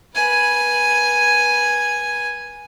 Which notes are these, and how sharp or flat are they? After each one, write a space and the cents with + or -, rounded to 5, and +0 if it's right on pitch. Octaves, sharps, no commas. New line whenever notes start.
B4 -25 G#5 +0